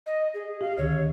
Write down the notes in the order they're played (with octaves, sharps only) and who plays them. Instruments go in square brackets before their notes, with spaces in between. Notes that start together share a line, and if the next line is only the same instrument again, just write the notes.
[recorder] D#5
G#4
[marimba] G4 [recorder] F5
[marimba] D2 D3 D#3 [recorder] C#5